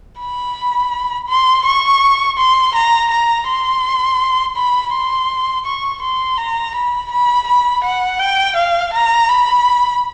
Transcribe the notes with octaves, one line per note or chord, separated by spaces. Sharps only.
B5
C6
C#6
C6
A#5
A#5
C6
B5
C6
C#6
C6
A#5
B5
B5
B5
F#5
G5
F5
A#5
B5